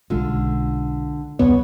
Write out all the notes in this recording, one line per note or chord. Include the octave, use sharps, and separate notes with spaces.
B1 D3 G#3 C#4 F4
D#1 C2 F#2 B3 C#5